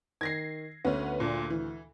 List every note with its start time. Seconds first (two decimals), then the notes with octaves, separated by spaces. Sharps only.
0.21 D#3 G#6 A#6 C7
0.85 D2 B3 C#4
1.20 A#2 D4
1.50 E3